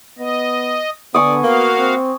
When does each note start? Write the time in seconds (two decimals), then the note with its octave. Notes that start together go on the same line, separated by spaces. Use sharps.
0.19 B3 D#5
1.14 D3 B3 D5 G#5 C#6 D#6
1.44 A#3 F#4 F5
1.78 C4